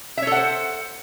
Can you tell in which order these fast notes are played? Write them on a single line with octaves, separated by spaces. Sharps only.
E5 C#5 A4 F#5 C5